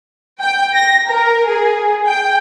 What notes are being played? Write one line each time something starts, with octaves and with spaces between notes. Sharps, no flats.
G5
A#6
A#4
G#4
G5